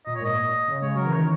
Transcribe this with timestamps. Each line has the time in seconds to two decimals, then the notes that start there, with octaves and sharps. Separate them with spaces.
0.06 A#2 D#5
0.16 C#5
0.21 G#2
0.24 A#2 D#5
0.68 C#3
0.82 G#3 C#5
0.94 F#3 A#4
1.05 E3
1.13 D#3 C#5